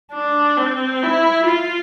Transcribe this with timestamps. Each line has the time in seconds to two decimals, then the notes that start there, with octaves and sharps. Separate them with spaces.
0.13 D4
0.57 C4
1.03 E4
1.47 F4